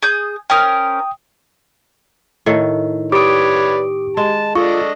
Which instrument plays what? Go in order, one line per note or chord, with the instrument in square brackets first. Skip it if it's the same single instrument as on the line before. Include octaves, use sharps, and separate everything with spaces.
[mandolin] G#4 D#6 G6
[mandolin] C#4 A#4 C5 [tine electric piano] G5 D#6
[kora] A2 D#3 A4
[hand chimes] G4 D7 [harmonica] B4 C#5 D5 [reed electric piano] D6 D#6
[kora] G#3 [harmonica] A5
[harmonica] D4 A4 D#5 [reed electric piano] F4 [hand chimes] C#6